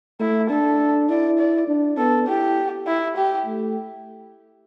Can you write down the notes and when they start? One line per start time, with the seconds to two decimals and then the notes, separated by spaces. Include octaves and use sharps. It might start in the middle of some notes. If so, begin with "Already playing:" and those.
0.20 A3 E4
0.50 D4 A4
1.09 E4 D5
1.38 D5
1.68 D4
1.98 B3 A4
2.28 E4 G4
2.87 E4
3.16 G4
3.46 A3